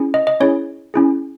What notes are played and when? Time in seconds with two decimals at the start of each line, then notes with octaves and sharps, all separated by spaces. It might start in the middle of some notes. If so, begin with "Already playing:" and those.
Already playing: C#4 E4 G#4
0.14 D#5
0.27 D#5
0.40 C#4 E4 G#4 C#5
0.94 C#4 E4 G#4